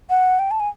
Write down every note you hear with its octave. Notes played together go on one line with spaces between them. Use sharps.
F#5
G5
A5
G#5